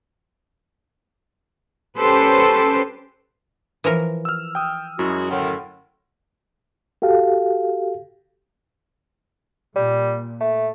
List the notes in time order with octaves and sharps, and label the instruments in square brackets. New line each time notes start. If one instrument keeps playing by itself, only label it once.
[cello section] C#4 G4 A4 B4 C5
[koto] E3 F3 A#4
[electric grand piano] E6 F6
G5 D#6
[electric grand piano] F#2 [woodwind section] G#3 E4 F#4
[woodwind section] A2 D3 D#3
[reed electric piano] F#4 G4 A4 F5
[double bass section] A#2 [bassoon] G3
[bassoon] A3